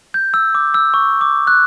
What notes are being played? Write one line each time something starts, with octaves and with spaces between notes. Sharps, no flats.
G6
E6
D6
E6
C#6
D6
F#6